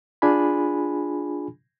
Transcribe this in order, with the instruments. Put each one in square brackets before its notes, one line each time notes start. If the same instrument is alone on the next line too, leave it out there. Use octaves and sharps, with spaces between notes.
[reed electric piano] D4 F4 G#4 G#5 B5